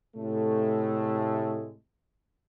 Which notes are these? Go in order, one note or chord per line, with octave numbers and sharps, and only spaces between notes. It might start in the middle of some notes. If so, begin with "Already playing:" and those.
A2 C3 G#3 A3